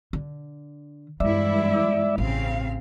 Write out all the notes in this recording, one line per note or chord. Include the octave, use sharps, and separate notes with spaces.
D3
E2 G2 G#3 E4 D5 E5
A1 C#3 C4 F5